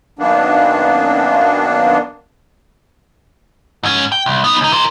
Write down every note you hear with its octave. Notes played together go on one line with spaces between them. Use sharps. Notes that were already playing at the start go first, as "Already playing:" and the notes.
F#2 D#3 A#3 B3 D4
G#2 C#4
G5
C2
B3 D#4
C#2 D#4
A#4 C5